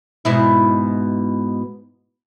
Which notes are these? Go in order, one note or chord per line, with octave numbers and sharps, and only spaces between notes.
G#2 B2 E4